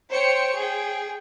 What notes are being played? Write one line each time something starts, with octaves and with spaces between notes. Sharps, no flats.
C5 C#5 G5 C#7
G#4 G5